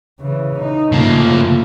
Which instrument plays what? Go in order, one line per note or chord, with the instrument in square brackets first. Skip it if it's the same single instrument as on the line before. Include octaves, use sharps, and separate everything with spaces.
[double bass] C#3 E3
D#4
[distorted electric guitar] C#3 A#3 [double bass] F3 A3